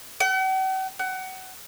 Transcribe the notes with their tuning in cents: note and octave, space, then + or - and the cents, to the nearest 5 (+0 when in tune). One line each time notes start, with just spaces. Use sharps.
F#5 +45
F#5 +25